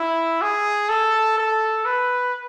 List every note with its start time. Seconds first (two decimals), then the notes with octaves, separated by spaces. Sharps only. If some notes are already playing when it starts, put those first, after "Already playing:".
Already playing: E4
0.42 G#4
0.89 A4
1.38 A4
1.85 B4